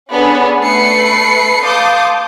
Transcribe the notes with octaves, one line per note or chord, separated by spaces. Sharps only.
B3 C#4 D4 G#4 A4
A3 B4 C7 C#7
F5 A5 C6 D6 D#6 G6